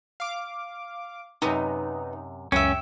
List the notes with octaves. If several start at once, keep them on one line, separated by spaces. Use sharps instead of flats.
F5 D6
F#2 C3 B3 D#4
C#2 F#2 C#3 C#4 E5 G5